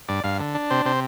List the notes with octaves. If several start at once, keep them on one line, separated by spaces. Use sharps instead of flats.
G2 D5
G2 F5
D3
D4
C3 C5
C3 C5